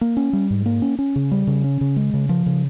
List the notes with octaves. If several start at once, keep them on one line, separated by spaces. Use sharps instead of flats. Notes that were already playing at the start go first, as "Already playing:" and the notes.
A#3
C#4
G3
G#2
A#3
C#4
C#4
C#3
G3
C#3
C#4
C#3
G#3
C#3
F3
C#3